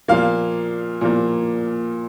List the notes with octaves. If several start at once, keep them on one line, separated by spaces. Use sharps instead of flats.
A#2 F3 A#3 F5
A#2 F3 A#3